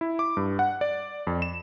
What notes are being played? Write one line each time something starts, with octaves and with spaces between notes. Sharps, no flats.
E4
D6
G2
F#5
D5
F2
E7